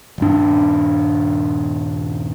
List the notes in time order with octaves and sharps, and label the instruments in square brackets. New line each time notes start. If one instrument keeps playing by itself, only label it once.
[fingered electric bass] D#1 G2 D4